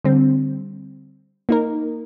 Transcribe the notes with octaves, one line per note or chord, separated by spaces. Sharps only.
D3 G3 C4
A#3 D#4 A#4